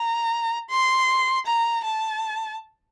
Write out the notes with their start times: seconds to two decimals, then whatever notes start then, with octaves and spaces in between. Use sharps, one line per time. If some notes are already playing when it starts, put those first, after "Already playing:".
Already playing: A#5
0.70 C6
1.46 A#5
1.84 A5